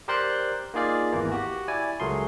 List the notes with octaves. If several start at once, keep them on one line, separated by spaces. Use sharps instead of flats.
G4 A#4 C5 D5 C6 F#6
A#3 D#4 F4 G#4 D5 F5
G#1 E2 E3 A#3
F#4 G4
E4 D5 G#5
C#2 F#3 A3 G#4 A#4 C6